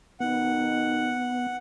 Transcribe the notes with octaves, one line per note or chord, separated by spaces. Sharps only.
B2 D#3 B3 D#4 F#5